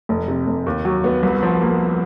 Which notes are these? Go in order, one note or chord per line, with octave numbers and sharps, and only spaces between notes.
F1
C3
F1
D#2
F#3
B3
C2
F3
A#3